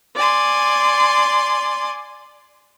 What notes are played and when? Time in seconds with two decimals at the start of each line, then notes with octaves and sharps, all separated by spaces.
0.15 D5 G#5 C6